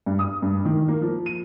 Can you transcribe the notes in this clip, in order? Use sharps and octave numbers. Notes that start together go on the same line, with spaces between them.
G2
D#6
G2
D#3
A#3
F3
D#7